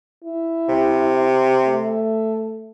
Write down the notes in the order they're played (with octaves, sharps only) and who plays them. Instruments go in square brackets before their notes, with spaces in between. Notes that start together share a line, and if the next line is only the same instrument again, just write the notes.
[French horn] E4
[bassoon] C3
[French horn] A3